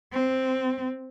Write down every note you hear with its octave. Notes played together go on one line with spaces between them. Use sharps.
C4